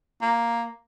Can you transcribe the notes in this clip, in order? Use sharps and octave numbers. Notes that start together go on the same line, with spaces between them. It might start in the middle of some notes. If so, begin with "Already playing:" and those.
A#3